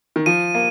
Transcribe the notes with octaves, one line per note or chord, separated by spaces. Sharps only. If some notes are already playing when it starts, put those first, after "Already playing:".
D#3
F3 D#7
A#3